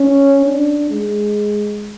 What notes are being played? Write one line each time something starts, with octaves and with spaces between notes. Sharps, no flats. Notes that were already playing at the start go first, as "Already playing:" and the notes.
Already playing: C#4
D4
G#3